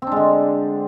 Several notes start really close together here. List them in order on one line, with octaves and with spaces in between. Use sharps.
C4 D4 G#3 D3